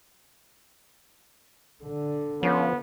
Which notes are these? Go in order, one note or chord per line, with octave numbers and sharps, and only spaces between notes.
D3
F3 B3 C#4